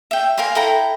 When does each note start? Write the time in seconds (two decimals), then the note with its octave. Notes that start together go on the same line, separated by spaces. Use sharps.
0.11 E5 G5
0.37 A#4 F5 G#5 C6
0.55 E4 A4 G5 A#5